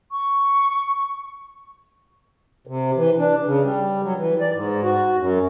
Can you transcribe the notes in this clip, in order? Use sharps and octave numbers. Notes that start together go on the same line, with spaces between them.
C#6
C3
E3
D4
C#3
G3
F#3
E3
D5
G#2
F#4
F#2